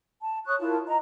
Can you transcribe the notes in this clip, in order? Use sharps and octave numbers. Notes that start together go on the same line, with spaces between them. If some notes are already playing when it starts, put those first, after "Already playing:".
A5
C#5 C#6 D#6 F#6
E4 F4 A#4 A5
D#5 A#5